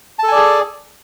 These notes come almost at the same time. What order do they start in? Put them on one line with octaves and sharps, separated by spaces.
A5 A4 G#5 D5 G#4